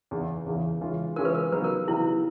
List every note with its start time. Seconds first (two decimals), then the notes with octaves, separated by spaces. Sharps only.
0.11 E2 C#3 E3
0.46 E2 C#3 E3
0.81 C#3 E3 G#3 C#4 F4
1.16 C#3 E3 G#3 C#4 F4 A#4
1.25 B4
1.35 A#4
1.52 C#3 F#3 B3 D#4 G4 B4
1.64 A#4
1.88 C#3 F#3 B3 D#4 E4 G4